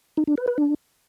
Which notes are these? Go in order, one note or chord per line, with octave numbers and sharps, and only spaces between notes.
D#4
D4
B4
B4
D4